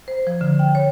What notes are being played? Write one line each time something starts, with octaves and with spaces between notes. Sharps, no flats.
C5
F3
D3
G5
C#5